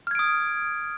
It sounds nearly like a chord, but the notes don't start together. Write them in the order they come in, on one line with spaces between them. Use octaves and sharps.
F6 G#6 D7 D#6